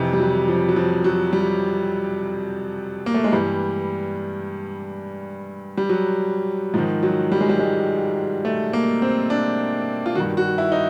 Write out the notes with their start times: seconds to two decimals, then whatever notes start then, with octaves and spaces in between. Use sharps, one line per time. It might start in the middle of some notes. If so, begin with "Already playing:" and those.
Already playing: F2 C3 E3
0.13 G3
0.20 F#3
0.48 F3
0.69 F#3
0.76 F3
1.04 F#3
1.33 G3
3.06 A#3
3.14 A3
3.24 G#3
3.32 G2 E3 G3
5.77 G3
5.89 F#3
6.74 G#2 F3
6.78 D#3
7.03 F#3
7.32 G3
7.41 G#3
7.49 G3
7.59 G#3
8.45 A3
8.73 A#3
9.02 C4
9.30 D4
10.06 F4
10.15 G2 D#3 F#4
10.37 F#4
10.58 E4
10.72 D#4